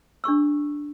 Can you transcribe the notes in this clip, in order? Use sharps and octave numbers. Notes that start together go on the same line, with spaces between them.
D4 G#4 C#6 E6